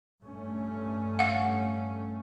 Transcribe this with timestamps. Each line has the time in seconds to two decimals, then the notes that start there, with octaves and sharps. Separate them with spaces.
0.22 G2 A3 C#4
1.19 F5 F#5